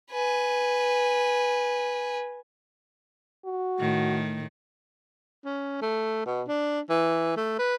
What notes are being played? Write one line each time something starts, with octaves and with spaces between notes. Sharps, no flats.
B4 G#5
F#4
A2 D#3
C#4
A3
B2
D4
E3
A3
B4